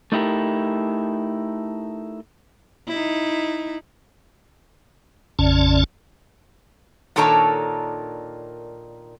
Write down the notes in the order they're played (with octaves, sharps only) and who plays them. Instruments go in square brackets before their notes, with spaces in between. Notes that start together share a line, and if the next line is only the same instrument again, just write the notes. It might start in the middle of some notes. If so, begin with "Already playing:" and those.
[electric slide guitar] A3 D#4 E4 G4 A#4
[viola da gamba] D#4 E4
[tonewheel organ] A1 F2 C#3 C#4 D5 A5
[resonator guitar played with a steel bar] A#2 D#3 D4 A4 C#5 A#5